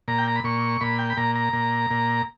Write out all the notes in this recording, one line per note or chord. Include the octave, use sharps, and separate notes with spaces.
A#2 A#5
G5
A#5
B5
A#2 C#6
A#2 B5
G5
B5
A#2 A#5
A#5
A#2
A#2